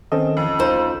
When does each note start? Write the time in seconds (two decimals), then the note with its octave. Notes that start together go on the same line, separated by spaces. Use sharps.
0.12 D#3 C4 C#4 A4 D#5
0.37 F2
0.59 D2 D#4 F4 C5